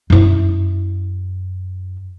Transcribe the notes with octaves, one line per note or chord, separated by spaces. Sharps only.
F#2 E4